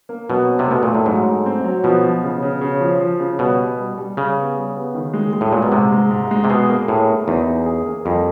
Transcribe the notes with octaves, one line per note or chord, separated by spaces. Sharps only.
A#3
B2 F#3
C4
C3
B2 A3
A#2 A3
A2
G#2 F#3
A3
C4
F#3
B2 F3
F3
C#3
C#3
C#3
F3
F3
C#3
B2 G3
B3
G3
G3
C#3 G3
B3
G3
B3
D#3
G#3
G#3
A2
A#2 G#3
B2
G#2 C3
G#3
G#2
G#3
C3
B2 G#4
A#3
A2 G#4
A#3
E2 D#4
G#4
G#4
A#3
F2 G3